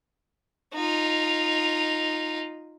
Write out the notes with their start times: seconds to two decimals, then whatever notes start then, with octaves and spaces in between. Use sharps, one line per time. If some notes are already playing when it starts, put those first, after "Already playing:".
0.74 D#4 F4